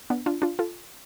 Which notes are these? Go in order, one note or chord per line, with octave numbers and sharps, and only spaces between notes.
B3 D4
D4 F4
D4 F4
F4 A4